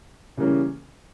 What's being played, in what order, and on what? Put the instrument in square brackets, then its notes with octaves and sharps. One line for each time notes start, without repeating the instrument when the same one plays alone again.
[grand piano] C#3 E3 G3 A#3 C#4